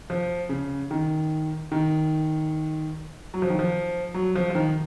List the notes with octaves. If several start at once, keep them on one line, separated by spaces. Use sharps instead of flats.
F3
C#3
D#3
D#3
F#3
F3
D#3
F3
F#3
F3
F3
D#3